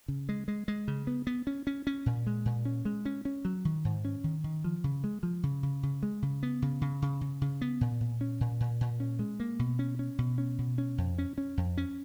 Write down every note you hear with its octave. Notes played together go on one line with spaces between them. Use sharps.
C#3
G#3
G#3
G#3
C#3
B3
B3
C#4
C#4
C#4
A#2
G#3
A#2
C#4
G#3
C#4
C#4
F#3
D#3
G#2
C#4
D#3
D#3
F3
C#3
G#3
F3
C#3
C#3
C#3
G#3
C#3
B3
C#3
C#3
C#3
C#3
C#3
B3
A#2
A#2
C#4
A#2
A#2
A#2
C#4
G#3
A#3
B2
C#4
C#4
B2
C#4
B2
C#4
F2
C#4
C#4
F2
C#4